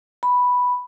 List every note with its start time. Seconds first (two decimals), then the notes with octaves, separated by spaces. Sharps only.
0.23 B5